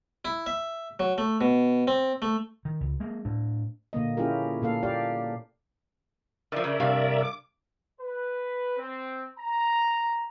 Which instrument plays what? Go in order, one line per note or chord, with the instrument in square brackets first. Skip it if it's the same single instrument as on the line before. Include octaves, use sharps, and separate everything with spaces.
[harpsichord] E4
E5
F#3
A3
B2
C4
A3
[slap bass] D#3
C#2
G#3 A#3
A2 D4
[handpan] A#2 D3 A#3 D#5
C#4 E4 F4 G4 G#4 A#4
A#2 A#3 A4 F5
G4 D5 F5
[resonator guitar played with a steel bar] D#3 F3 [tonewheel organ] A#4 D5 E5
[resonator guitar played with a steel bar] C#3
[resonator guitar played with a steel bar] G2 F5 [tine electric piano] C3
[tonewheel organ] D6
[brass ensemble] B4
C4
A#5